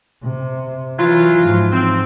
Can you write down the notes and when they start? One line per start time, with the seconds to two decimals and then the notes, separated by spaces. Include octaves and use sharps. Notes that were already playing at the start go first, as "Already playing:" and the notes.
0.24 C3
0.99 E3 F#3 E4 F4
1.40 G#2 F3
1.73 C4